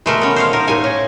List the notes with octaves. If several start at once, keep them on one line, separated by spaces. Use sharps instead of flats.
B2 D#3 G#3 A3 A#4 B4
B3 C#4
C5 C#5 F5
F3 D#4 A#4
A2 D#4 A4 A#4 G#5
C#4